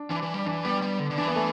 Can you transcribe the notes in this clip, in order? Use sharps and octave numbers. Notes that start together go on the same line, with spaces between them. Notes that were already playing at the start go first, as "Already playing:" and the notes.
Already playing: D4
E3 D4
E3
G3
E3 D4
G3 B3
G3
D3
D3
E3 D4
B3
A3